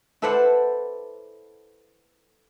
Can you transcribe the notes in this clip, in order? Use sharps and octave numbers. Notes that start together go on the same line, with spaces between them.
E4 A4 B4 C5 D5 F#5